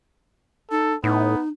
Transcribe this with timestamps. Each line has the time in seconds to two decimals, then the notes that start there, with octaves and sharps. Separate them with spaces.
0.71 D#4 A4
1.04 A2 B3 D#4